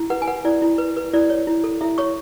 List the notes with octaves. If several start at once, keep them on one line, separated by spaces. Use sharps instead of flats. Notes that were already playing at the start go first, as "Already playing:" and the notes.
Already playing: E4
B4 F#5
G#5
B4 F#5
E4 D5
E4
B4
B4
E4 D5
C#5
E4
A4
E4 E5
C#5 C#6